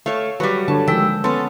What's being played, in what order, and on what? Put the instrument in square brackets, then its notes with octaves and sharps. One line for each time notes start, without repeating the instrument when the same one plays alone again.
[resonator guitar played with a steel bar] A3 [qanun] C#5 F5
[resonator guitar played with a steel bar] F#3 G3 [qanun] B4
[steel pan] D3 C#5 [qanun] A5
[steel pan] D#3 F3 [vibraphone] G#3 E6 [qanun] G5
[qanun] B3 C#4 [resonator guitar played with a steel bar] A4 [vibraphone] C6